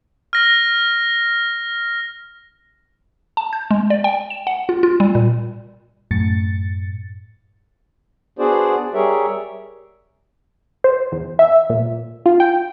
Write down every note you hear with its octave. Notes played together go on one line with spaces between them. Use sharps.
F6 A#6
A5
G6
G#3
D5
G5
E7
F#5
F4
F4
G3
A#2
F#2 A2 A6 C#7
B3 D4 F#4 G#4 C5 D5
G3 G4 G#4 A#4 C#5 E5
C5
E2
E5
A#2
F4
G5